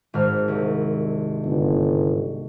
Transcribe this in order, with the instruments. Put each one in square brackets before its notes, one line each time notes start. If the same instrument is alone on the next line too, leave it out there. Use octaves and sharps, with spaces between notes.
[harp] G#1 G#2 F6
C2
[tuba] G1